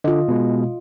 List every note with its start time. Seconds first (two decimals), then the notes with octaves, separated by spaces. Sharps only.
0.04 D3 F4 D#5
0.28 B2 G#3